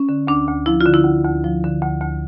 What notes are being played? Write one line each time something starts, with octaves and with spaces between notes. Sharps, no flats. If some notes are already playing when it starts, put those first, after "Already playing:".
Already playing: C#4
D3
D2 D4
D2
F3 E4
D3 F4
E4
D2
D2
F3
D3
D2
D2